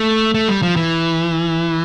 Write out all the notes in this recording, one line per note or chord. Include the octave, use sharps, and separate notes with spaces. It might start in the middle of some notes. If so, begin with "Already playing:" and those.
Already playing: A3
A3
G3
F3
E3